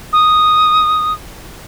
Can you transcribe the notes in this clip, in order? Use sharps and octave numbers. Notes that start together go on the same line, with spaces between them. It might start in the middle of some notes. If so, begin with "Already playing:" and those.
D#6